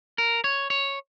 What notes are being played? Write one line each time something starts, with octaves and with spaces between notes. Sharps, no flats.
A#4
C#5
C#5